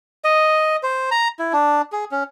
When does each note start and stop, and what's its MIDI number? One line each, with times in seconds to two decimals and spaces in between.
0.24 0.76 75
0.83 1.10 72
1.11 1.28 82
1.39 1.53 64
1.53 1.82 62
1.92 2.05 68
2.11 2.23 61